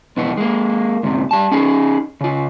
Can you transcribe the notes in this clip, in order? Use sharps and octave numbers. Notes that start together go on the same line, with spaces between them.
B1 F2 B2 E3 B3
G#3 A#3
D2 G#2 C3
G3 A5
C#4 D#4 G#4
C#3 F4